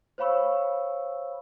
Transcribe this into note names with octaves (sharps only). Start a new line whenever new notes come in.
C5 C#5 F5 B5 C#6 E6